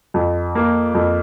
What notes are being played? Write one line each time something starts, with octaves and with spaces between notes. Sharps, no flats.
F2
A#3
F2